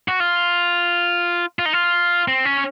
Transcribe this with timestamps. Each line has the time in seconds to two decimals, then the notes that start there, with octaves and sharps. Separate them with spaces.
0.08 F#4
0.20 F4
1.59 F4
1.66 D#4
1.73 F4
2.28 C4
2.45 C#4